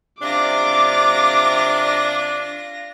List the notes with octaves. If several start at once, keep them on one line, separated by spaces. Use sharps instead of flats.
C3 D4 F4 D6 A#6